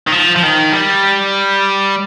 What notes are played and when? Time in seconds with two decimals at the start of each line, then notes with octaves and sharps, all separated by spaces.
0.07 D#3
0.12 F3
0.36 F3
0.43 D#3
0.73 G3